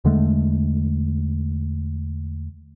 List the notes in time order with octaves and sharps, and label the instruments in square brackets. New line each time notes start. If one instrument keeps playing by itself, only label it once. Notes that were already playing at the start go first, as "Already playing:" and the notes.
[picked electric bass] E2 D3 G#3 A3